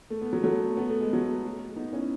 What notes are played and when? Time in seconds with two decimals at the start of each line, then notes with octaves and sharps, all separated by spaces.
0.10 A3
0.21 B3
0.33 F#3 A3
0.43 F#3 A3
0.77 B3
0.89 A3
1.01 G#3
1.13 F#3 A3
1.76 B3 D#4
1.93 C#4 E4